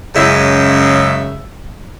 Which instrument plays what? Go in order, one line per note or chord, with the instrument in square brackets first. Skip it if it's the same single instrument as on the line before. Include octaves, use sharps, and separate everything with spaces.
[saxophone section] F#2 C#3 G#3 E5